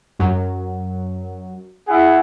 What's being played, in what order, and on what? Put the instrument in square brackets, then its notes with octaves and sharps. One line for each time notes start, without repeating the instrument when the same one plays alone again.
[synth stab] F#2 F#3
[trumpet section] E4 G#4 F#5